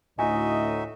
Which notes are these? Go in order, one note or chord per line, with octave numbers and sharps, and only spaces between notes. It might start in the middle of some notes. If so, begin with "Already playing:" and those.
D2 A2 D#4 F#4 D#5 E5 G#5